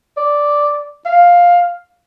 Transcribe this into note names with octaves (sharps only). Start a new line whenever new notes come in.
D5
F5